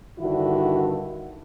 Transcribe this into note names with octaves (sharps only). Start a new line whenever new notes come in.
G2 D3 D#3 E4 F#4